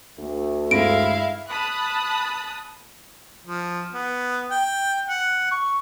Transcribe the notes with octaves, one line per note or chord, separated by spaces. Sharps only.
D2 A3
G2 G#3 E4 F5 A#6 D7
A5 B5 D#6 F#6
F3
B3
G5
F#5
C#6